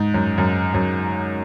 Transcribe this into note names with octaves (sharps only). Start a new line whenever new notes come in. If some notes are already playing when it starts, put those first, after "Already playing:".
Already playing: G#2
F#2
F#2
F#2